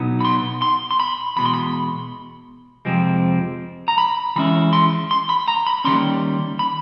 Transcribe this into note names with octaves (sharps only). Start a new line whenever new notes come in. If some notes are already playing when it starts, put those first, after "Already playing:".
Already playing: B2 F#3 B3 D#4
B5
C6
C6
C6
B5
E2 B2 G#3 B5
C6
B5
F2 C3 F3 G#3 C4
A#5
B5
E3 G#3 C#4 E4 B5
C6
C6
B5
A#5
B5
D#3 G3 A#3 C#4 C6
B5